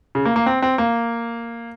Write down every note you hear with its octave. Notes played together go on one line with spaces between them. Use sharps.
C#3
A#3
A#3
C4
C4
A#3